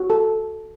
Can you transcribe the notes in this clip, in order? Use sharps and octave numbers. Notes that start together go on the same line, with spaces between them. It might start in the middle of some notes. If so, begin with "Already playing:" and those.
Already playing: F#4
A4